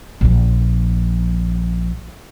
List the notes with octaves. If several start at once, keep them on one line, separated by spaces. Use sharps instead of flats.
A#1 F3